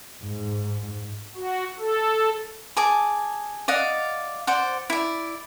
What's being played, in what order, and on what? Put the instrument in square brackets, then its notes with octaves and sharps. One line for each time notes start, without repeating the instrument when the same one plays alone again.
[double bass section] G#2
[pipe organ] F#4
A4
[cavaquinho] G#4 A5 D6
D5 D#5 F5 F#5
C5 D5 F#5
E4 D5